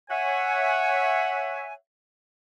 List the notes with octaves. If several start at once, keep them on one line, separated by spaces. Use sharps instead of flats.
C#5 E5 F#5 G#5